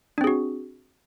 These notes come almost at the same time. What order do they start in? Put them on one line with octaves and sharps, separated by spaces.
D4 C4 G#4 F#4